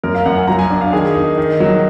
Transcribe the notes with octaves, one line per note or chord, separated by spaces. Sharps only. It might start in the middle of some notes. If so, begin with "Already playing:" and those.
F#2 A#4
F5
F#2 F#5
G#5
F#3 A#5
G#5
D4
F5
D#3 G#4
D#4
D#3
F#3